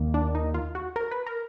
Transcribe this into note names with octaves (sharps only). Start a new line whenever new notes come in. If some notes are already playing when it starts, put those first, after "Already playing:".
Already playing: D#2 D#3 A#3
D4
D#4
F4
F#4
A#4
B4
A#4